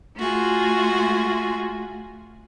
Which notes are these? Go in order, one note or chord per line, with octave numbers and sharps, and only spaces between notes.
A3 F4 F#4 G#4